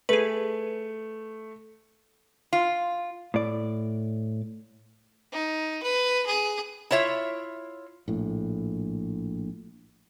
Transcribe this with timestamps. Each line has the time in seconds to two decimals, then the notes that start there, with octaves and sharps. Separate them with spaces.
0.09 A3 G#4 B4
2.53 F4
3.34 A2 D5
5.32 D#4
5.83 B4
6.27 G#4
6.91 E4 F4 C#5 E5
8.08 A#1 A2